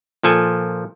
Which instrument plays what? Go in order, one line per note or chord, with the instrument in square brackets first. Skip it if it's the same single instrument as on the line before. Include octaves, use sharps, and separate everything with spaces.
[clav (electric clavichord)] A#2 F3 A4 G#5